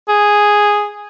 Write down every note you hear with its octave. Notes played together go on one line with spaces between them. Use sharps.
G#4